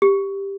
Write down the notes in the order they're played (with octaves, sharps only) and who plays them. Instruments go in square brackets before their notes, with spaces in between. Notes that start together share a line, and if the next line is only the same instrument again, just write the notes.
[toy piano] G4